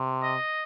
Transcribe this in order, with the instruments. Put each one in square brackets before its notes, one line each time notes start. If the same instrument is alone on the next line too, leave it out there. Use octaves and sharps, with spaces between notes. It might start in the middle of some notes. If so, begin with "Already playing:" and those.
Already playing: [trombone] C3
[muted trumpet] D#5